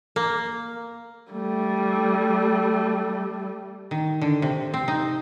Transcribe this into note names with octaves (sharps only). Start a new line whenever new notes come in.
A#3
G3 A3
D#3
D3
C3
C4
D#4